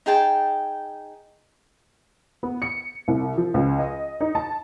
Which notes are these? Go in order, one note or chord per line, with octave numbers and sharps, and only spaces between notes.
D#4 G#4 G5 A5
B3
C#7
C2
F3
C#2
D#5
D#4
A5